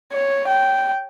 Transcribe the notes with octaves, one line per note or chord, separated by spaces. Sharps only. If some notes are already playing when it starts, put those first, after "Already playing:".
C#5
G5